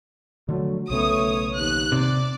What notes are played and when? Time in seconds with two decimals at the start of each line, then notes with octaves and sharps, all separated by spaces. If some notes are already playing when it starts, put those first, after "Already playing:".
0.49 D3 F3 F#3 A3
0.90 B1 C#3 A3 B3 C#5 D#6
1.57 D#2 F#6
1.92 C3 D5